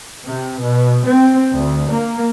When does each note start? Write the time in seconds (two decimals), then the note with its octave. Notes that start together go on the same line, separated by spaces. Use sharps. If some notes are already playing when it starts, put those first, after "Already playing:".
0.25 C3
0.63 B2
1.09 C4
1.57 D2
1.94 A#3